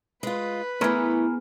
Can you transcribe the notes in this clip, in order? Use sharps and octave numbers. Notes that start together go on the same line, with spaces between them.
G#3 F4 B4
E3 A3 B3 G#4 A#4